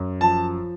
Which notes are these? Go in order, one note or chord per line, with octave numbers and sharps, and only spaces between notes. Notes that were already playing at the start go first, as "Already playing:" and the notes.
Already playing: F#2
F3 A5